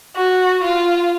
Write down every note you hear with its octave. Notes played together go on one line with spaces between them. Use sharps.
F#4
F4